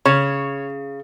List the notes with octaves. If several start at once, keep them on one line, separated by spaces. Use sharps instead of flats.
C#3 C#5